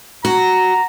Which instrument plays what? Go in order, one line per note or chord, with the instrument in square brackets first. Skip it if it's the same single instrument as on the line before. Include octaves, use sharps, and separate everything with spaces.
[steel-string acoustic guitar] F#4 [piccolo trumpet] A#5